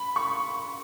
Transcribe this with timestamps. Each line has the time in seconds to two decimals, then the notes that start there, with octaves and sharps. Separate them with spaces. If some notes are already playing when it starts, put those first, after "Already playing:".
Already playing: B5
0.16 C#6